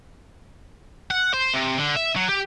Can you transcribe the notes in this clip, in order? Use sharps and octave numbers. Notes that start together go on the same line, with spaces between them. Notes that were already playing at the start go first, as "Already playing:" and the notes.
F#5
C5
C3
D3
E5
F#3
G4